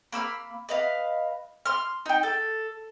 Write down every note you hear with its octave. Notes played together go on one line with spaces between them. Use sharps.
A#3 B5 E6 F6
B4 D#5 F5
C6 F6
D#4 G5
A4